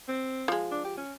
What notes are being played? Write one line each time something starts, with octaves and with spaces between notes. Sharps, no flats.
C4
F3 G#3
D4
G4
C#4